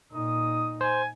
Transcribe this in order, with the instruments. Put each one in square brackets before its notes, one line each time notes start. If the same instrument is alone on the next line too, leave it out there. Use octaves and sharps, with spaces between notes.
[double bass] A#2 D#4 [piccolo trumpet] D#6
[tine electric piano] C5 [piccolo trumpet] G#5